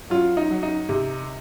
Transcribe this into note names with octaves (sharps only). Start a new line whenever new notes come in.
F#3 F4
D#4
F#3
D#4
C3